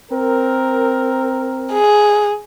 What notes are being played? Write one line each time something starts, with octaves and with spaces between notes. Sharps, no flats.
C4 A#4
G#4